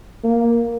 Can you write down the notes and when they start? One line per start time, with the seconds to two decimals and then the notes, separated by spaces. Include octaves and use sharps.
0.24 A#3